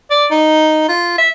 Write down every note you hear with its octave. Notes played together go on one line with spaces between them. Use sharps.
D5
D#4
F4
E5